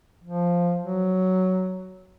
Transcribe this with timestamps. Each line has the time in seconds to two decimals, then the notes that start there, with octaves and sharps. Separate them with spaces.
0.24 F3
0.82 F#3